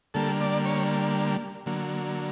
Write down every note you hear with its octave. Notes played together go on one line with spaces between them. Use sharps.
D3 G3 A#3 A4
D5
C#5
D3 F#3 A#3